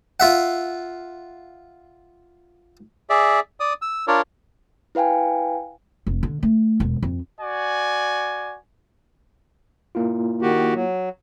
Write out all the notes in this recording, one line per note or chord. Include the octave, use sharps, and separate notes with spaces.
F4 E5 F#5
G#4 D5 E5
D5 D#6
E6
D4 F4 A#4 C#5 D5
E4 B4 F5 G5 G#5
F1
D3
A3
E1
F2
F#4 D5 G#5
A#3 E4 F4
D#3 F#4 G4
F#3